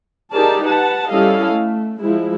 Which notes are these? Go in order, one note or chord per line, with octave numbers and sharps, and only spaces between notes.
D#4 G4 G#4 A#4 D5 A5
B4 F#5 A5
G3 C#4 E4 A4 D#5 F5
A3
F3 G#3 E4